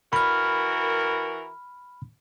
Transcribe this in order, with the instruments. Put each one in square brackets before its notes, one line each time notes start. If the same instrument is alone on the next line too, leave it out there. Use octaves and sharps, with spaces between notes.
[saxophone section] E3 F#4 A#4 [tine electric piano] B5 F6